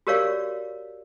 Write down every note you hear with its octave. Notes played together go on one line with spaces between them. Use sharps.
F#4 G4 A#4 C#5 D5 F5